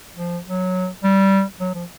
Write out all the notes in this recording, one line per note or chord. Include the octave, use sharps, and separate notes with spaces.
F3
F#3
G3
F#3
F3